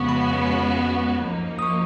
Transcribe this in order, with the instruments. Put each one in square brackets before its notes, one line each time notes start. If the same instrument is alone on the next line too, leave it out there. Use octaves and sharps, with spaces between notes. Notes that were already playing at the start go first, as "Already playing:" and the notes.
Already playing: [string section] F2 C#3 G#3 B3 F#4 [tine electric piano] C#6
[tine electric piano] B5
B5
[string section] F#2 F3 A#3 D#4
[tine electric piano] D#6
C#6